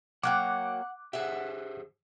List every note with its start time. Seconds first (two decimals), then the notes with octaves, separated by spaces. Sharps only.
0.23 F#3 A#3 F#5 G5 D6 F#6
1.13 G4 G#4 C5 E5 F#5